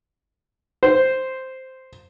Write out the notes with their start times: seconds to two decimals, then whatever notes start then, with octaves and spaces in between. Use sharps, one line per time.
0.83 C5